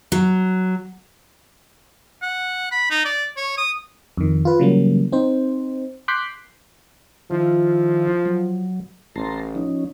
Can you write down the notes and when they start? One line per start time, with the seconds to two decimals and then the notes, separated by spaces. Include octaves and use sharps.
0.12 F#3
2.22 F#5
2.72 B5
2.90 D#4
3.05 D5
3.37 C#5
3.58 D#6
4.17 F2 D#3
4.45 F4 B4
4.59 C#3 E3 F#3 G3 A#3
5.12 C4 D#4 C5
6.08 C6 D6 F#6 G6 B6 C7
7.31 D#3 F3 E4 F4
8.26 F#3
9.16 A1 A5 A#5 C6
9.55 F3 C#4 D#4